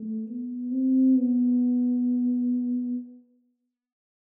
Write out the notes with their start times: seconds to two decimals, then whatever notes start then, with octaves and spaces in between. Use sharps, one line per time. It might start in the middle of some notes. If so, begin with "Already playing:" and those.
Already playing: A3
0.26 B3
0.71 C4
1.15 B3